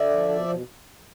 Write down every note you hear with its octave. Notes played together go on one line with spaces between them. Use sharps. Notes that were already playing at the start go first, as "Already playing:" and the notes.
Already playing: D3 D5 E5
F3
B2
B2